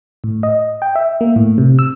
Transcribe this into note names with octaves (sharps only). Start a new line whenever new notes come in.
A2
D#5
G5
E5
A#3
A2
C3
E6